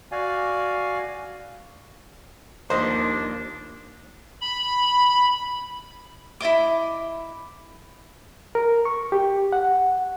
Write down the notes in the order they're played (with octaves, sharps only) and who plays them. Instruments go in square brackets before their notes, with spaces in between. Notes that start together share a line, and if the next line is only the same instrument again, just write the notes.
[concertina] F#4 D5 F5 G#5
[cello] D#2 [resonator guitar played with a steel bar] F3 G3 A#3 [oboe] D4 [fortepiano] C5 D#5
[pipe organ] B5
[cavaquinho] E4 D5 D#5 D6
[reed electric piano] A#4
C#6
G4
F#5